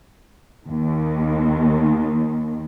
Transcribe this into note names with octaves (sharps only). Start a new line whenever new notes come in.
D#2 D#3